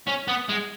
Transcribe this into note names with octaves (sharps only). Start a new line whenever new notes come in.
C#4
B3
G#3